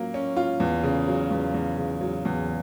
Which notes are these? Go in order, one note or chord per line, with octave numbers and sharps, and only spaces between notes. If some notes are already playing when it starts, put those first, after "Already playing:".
Already playing: F#3 A#3 C#4 F4
C#4
F4
E2
C#3
F#3
E2
E2
C#3
F#3
E2